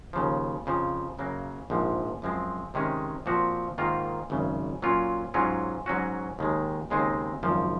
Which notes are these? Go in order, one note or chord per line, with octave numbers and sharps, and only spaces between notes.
D#2 C#3 F3
F2 C#3 F3
F#2 C#3 F#3 A#3
A#1 G#2 F3
F#2 F3 G#3 C4
C3 D#3 G#3 C#4
A#2 F3 C4 F#4
G#2 D#3 A#3 F4
G#1 F#2 C#3
A#2 F#3 C#4 F4
G#2 F#3 C#4 F4
G#2 F#3 C#4 F#4
D#2 D#3 G#3
D#2 C#3 G#3 C4 D#4
G#1 F#2 C#3 F3